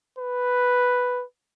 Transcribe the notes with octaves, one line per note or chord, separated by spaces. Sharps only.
B4